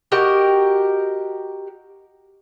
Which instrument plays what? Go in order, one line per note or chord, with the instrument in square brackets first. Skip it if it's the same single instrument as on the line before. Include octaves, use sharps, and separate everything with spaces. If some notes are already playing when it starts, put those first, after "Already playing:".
[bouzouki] F#4 G4 A#4 D#5